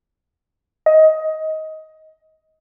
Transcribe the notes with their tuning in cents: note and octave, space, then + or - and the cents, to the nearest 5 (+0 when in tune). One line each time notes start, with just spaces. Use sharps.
D#5 +15